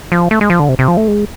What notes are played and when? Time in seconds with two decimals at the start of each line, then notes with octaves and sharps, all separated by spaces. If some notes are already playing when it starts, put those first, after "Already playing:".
0.12 F3
0.31 A3
0.41 G#3
0.50 F3
0.60 D3
0.69 C3
0.79 C3
0.88 F3
0.97 A3
1.08 G#3